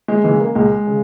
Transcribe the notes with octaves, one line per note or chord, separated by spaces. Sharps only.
G#3
C#3 E3 G#3
A#3
C#2 G#3
C#3